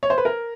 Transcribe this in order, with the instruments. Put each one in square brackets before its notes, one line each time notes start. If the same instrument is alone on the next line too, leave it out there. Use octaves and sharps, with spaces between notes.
[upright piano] C#5
C5
B4
A#4